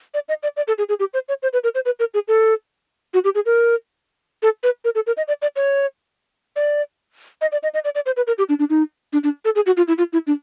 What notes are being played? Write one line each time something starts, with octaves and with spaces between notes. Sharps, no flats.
D5
D#5
D5
D5
A4
G#4
G#4
G4
C5
C#5
C5
B4
A#4
C5
B4
A#4
G#4
A4
F#4
G4
G#4
A#4
A4
B4
A#4
A4
A#4
D#5
D5
D5
C#5
D5
D#5
D5
D#5
D#5
D5
D5
C5
B4
A#4
G4
D4
D4
D#4
D4
D4
A4
G#4
F#4
F4
E4
F4
E4
D4